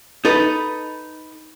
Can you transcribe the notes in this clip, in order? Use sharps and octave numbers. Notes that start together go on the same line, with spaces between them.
D#4 A4 B4